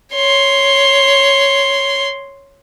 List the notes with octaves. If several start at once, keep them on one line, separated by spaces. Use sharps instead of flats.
C#5 C6